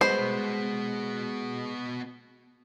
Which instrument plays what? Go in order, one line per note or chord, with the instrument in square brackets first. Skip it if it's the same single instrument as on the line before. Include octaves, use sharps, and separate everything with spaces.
[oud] G#3 B4 [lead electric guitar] B3 F#4 [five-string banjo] C5